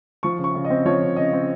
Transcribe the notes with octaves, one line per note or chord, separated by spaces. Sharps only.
F3 C#6
C#3
C#6
C#3
D#5
C4
F3 C#5
C#3
C#3 D#5
C4